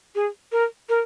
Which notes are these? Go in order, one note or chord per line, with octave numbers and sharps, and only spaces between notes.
G#4
A#4
A#4